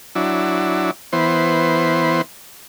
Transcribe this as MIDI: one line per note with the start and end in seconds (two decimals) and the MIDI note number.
0.15 0.91 54
0.15 0.91 62
0.15 0.91 64
1.13 2.22 52
1.13 2.22 59
1.13 2.22 72